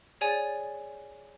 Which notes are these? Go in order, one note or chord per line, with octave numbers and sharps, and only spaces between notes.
G#4 C#5 D5 G#5 A6